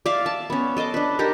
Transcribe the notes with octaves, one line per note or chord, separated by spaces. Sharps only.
D5 E5 F5
A5
B3 C#4
A4 D#5 C6 D6
D4 B4
D#4 G4 A4 A#4